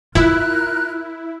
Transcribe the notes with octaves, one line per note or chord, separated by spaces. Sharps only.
E4 F4 A#4 F6 F#6